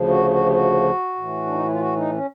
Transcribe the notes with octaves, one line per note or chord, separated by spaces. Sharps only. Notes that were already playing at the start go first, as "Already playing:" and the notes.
Already playing: D2 C#3 F3
F#4
F#4
G4
F#4
A2 E3
D4
D#4
E4
F4
F#4
D#4
C#4